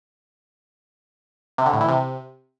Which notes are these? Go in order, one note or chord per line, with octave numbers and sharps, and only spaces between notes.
C3
D3
A2
E3
C3